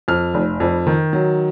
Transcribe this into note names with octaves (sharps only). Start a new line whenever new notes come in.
F2 F6
F1
F2
D#3
F#3